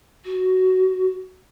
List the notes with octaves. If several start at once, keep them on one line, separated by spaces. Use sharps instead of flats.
F#4